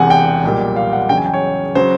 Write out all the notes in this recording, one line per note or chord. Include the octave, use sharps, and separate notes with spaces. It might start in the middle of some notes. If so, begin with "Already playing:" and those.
Already playing: E1 E2 C3 F#5 G#5
G5
B1 A#2 G3
F5
F#5
E2 C#3 F#3 G5
G#5
G5
C#5
C#3 F#3 C5